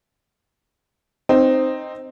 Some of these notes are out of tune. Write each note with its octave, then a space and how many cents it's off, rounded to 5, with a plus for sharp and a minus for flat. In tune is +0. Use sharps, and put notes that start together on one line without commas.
C4 +0 D#4 -10